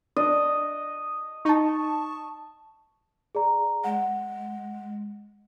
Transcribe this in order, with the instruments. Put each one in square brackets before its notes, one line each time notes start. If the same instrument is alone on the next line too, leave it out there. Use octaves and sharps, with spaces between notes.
[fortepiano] D4 [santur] D#5
[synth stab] D#4 [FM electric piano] A5 C#6
[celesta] G#4 D5 A#5
[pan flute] G#3 [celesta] F#5